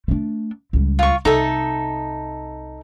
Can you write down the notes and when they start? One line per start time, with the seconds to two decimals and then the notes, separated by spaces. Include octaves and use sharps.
0.08 A3 D4
0.73 C#2 G3
0.99 F4 C#6
1.25 C2 D#4 A4 E5